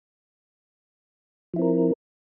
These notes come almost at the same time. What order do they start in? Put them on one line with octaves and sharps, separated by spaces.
F3 E4 C4 A#4